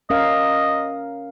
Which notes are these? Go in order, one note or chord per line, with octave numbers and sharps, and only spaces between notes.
C#4 A#4 D#5 F5